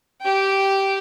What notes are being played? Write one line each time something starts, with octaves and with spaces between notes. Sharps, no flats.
G4 G5